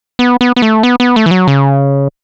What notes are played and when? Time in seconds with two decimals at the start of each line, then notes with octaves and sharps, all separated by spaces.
0.19 B3
0.41 B3
0.56 B3
0.62 A3
0.83 B3
1.00 B3
1.16 A3
1.26 E3
1.31 F#3
1.48 C#3